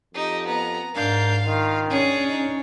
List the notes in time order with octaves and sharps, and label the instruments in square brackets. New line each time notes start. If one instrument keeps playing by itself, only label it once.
[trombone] F2 [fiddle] D#4 [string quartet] G4 D#5
[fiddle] B3 [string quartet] A#5
[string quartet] G#2 D4 G6 [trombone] A#4 [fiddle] F5
[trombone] D#3 [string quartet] F4
[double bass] C#4 [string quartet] D4 C#5 [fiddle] G#4
[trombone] D#4